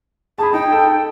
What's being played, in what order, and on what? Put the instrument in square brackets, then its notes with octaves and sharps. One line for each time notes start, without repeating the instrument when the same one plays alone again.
[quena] G#4 [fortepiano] A5 B5
[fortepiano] D#4 [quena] G5
[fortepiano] A4